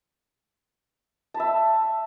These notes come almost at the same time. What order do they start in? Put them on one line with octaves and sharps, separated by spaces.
A5 B5 E5